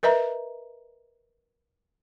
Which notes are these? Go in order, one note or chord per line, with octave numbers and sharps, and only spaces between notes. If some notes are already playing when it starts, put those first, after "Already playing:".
A#4 B4 D#5 E5 A#5